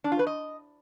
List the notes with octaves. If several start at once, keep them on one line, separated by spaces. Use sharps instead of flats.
D4
F4
B4
D#5